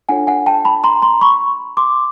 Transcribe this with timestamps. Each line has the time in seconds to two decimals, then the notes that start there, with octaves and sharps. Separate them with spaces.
0.09 D4 F4 A4 C#5 F#5 G#5
0.27 F#5 G#5
0.46 G5 A5
0.65 A5 B5
0.84 A#5 C6
1.02 A#5 C6
1.21 B5 C#6
1.77 C6 D6